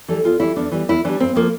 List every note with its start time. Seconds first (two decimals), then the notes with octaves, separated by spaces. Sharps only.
0.08 E3 G3 A4
0.24 E2 F4
0.40 E3 G3 E4
0.56 E2 D4
0.72 E3 G3
0.89 E2 E4
1.05 E3 G3 D4
1.20 G2 C4
1.35 F3 A#3